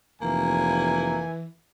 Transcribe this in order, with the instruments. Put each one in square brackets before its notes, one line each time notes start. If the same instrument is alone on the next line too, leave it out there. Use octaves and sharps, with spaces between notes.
[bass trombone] F1 [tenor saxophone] E3 [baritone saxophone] A#3 [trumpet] G#5